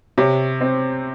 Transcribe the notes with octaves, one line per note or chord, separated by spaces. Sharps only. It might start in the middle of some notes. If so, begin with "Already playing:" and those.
C3 C#5
C4